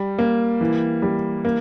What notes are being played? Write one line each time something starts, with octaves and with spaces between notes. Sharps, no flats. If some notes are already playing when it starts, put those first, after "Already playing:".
Already playing: G3
A#3
E3
G3
A#3